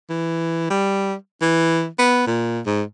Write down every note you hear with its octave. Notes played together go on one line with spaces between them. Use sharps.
E3
G3
E3
B3
A#2
G#2